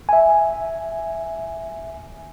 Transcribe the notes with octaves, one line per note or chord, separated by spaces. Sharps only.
E5 G#5